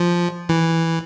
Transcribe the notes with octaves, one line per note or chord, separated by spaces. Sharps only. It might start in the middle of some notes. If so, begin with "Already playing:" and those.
Already playing: F3
E3